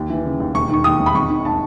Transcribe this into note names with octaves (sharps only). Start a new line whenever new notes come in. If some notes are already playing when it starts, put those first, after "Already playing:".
Already playing: D#2
E3
C#3
D#2
E1 C#6
D#3 C#6
D#2 D#6
E1
B5
G#1 C#6
D#3
A5